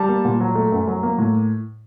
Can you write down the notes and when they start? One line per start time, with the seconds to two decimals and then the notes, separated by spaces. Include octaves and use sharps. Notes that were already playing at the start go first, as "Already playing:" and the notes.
Already playing: G3 A5
0.09 A#3
0.25 A#2
0.40 F#3
0.55 A3
0.72 F#2
0.87 F#3
1.03 A#3
1.18 A2